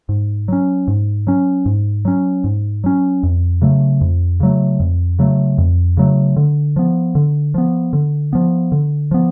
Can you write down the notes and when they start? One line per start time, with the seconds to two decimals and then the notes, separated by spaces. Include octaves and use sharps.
0.09 G#2
0.48 F#3 C#4
0.88 G#2
1.27 F#3 C#4
1.66 G#2
2.05 F#3 C#4
2.44 G#2
2.84 F#3 C#4
3.23 F2
3.62 C#3 F#3 A3
4.01 F2
4.40 C#3 F#3 A3
4.80 F2
5.19 C#3 F#3 A3
5.58 F2
5.97 C#3 F#3 A3
6.37 D3
6.76 F3 B3
7.15 D3
7.54 F3 B3
7.93 D3
8.33 F3 B3
8.72 D3
9.11 F3 B3